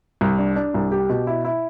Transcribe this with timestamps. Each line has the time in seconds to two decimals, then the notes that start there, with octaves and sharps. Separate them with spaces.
0.21 C2
0.38 D4
0.56 D4
0.74 C2
0.92 G4
1.09 B2
1.27 E4
1.45 E4